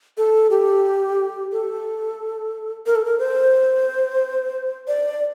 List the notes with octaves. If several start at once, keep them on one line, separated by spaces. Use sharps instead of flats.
A4
G4
A4
A#4
A4
A#4
C5
D5